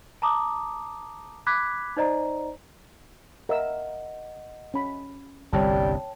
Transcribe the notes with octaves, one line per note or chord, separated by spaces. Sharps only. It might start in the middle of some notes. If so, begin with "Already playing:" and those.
A5 A#5 D6 D#6
B5 D6 F#6 G#6 B6
D#4 C5 D5 D#5 A#5
A#4 D#5 E5 F#5 E6
C#4 B5
G1 C2 G3 C#5 G5 A5